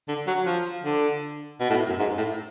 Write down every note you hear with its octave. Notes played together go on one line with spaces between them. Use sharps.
D3
F#3
F3
D3
B2
A2
F#2
G#2
A2